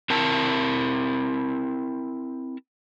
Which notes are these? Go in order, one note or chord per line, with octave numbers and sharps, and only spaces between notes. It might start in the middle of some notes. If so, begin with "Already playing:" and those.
C4 E4 A#4 A5